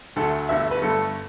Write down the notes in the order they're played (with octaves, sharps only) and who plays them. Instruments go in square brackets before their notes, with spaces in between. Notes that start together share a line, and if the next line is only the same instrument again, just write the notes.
[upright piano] D2 D3 A3 A4
G1 G2 D3 A3 E5
E5
B4
G1 G2 D3 A3 A4